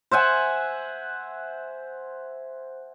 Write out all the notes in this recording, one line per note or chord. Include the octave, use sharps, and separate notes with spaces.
C5 E5 F#5 G#5